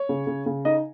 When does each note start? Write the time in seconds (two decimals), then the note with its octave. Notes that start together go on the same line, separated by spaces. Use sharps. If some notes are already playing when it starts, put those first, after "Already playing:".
Already playing: C#5
0.09 C#3
0.27 C#3
0.46 C#3
0.65 D#4 D#5